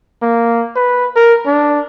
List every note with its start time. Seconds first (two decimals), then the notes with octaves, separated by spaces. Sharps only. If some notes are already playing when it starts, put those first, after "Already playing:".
0.22 A#3
0.75 B4
1.16 A#4
1.46 D4